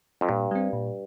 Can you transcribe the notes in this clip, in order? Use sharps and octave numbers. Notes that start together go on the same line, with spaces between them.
F2
G2 A#2
G3 C4
A#2